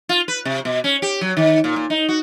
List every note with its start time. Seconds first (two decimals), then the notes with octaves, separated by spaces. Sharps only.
0.09 F4
0.28 B4
0.45 C3
0.65 B2
0.84 C#4
1.02 G4
1.21 F#3
1.37 D#3
1.64 A#2
1.76 A#2
1.90 D#4
2.09 F#4